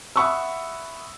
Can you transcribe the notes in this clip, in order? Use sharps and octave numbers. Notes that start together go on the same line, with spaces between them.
E5 F#5 B5 C#6 D#6 E6